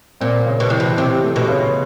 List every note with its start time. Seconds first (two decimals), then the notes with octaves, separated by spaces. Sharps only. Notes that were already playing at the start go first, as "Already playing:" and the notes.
0.21 A#2 C4
0.46 C#3
0.60 B2
0.70 C3 E3
0.80 B2
0.97 C3 C4
1.24 A3
1.36 B2
1.48 C#3